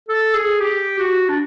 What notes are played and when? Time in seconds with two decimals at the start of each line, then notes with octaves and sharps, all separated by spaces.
0.09 A4
0.34 G#4
0.60 G4
0.99 F#4
1.29 D4